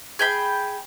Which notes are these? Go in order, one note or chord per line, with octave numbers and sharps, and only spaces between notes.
G#4 G5 B5